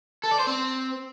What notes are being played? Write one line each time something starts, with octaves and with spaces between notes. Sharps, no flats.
A4
D5
C5
C4